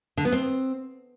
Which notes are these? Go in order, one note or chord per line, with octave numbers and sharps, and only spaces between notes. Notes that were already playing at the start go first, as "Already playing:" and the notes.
D3
B3
C4